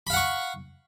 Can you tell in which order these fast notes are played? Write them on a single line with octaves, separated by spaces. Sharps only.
B5 F5 F#5 C#6